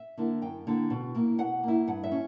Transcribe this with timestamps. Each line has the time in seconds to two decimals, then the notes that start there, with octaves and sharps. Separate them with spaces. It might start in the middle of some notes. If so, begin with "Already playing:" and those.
Already playing: E5
0.18 D3 A#3 E4
0.42 F#2 G5
0.67 D3 A#3 E4
0.90 B2
1.15 A#3 E4
1.38 B2 F#5
1.63 A#3 E4
1.87 G2 F#5
2.03 E5
2.12 C#4